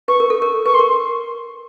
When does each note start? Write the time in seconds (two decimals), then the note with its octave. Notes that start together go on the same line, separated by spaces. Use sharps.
0.08 B4 C#6
0.20 A#4
0.30 A4
0.42 A#4
0.66 B4 C#6
0.74 C6
0.79 A#4